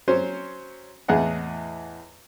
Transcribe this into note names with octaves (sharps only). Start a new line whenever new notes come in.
F#3 C#4 C5
E2 A2 G#4 D#5 F#5